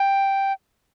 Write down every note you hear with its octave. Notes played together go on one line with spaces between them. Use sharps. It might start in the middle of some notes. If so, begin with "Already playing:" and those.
Already playing: G5